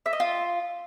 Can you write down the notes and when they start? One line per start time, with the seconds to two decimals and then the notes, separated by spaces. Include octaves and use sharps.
0.06 E5
0.13 D#5
0.20 F4